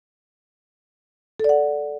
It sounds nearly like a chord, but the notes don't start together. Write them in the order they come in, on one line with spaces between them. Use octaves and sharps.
A4 D5 F#5